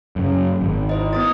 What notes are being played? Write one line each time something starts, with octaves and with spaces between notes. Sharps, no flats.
F#2 C#3
G#1
E4 C5 D#5
B3 D#6 A6